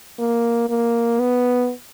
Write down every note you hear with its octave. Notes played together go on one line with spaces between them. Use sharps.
A#3
A#3
B3